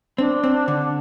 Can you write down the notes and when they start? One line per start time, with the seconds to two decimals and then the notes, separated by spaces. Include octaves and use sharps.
0.18 C4 D4
0.44 C4
0.68 D3